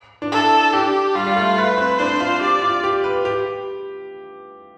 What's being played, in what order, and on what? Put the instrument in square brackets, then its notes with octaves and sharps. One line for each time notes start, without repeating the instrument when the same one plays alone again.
[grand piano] D4
[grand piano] E4 [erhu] A4
[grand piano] D4 [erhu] G4
[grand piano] G3 [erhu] F4
[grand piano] G3
A3
[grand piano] A3 [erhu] B4
[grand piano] C4
[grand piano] D4 [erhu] C5
[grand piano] F4
[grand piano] G4 [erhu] D5
[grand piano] F4
G4
B4
G4